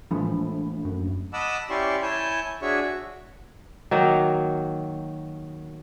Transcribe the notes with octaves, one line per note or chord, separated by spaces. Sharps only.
A#1 A2 E3 F3 G#3 A3 B5
F#2
D#5 F#5 A5 B5 D6 E6
C#4 E4 G4 D5 C6 C#6
E4 C#5 G#5 A5 G6
D4 F#4 G#4 C#5 E5 C#6
F#4
D#3 F#3 A#3